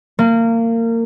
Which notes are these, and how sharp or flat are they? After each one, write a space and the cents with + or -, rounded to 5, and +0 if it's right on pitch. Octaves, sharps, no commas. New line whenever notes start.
A#3 -25